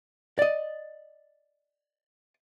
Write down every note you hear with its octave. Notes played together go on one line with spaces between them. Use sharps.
D5 D#5